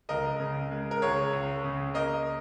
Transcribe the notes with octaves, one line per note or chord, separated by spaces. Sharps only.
C#2 A#4 D#5
C#3
G#3
A#4
C#2 G#4 C#5
C#2
C#3
A#3 A#4 D#5